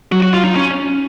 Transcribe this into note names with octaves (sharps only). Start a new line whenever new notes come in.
F#3 F#4
F#4
F4
D#4
C#4